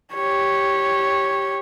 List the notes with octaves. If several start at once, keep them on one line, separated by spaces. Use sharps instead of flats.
G4 C#5